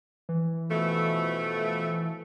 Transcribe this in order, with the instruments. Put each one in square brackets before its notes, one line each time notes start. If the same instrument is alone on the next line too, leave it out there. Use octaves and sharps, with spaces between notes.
[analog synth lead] E3
[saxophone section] B2 F3 A3